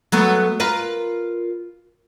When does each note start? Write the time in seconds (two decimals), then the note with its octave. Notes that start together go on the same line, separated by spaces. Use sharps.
0.12 F#3 A3 B3
0.60 F4 A#4 B4